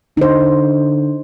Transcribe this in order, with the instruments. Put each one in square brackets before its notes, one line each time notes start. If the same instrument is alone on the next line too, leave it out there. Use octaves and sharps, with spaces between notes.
[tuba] D3 [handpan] D#4 C5